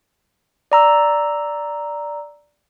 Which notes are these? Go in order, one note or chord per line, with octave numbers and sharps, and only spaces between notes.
D5 A#5 E6